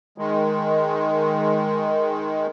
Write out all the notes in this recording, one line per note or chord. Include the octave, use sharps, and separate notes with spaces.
D#3 G#3